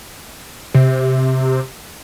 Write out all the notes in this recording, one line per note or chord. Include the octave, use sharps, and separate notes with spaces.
C3